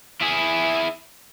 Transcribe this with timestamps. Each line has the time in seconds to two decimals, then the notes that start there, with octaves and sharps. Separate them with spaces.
0.21 E4 G#4